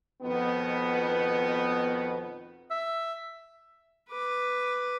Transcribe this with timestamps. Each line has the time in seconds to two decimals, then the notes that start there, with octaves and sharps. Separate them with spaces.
0.23 F2 B2 D#3 B3
2.71 E5
4.09 B4 D6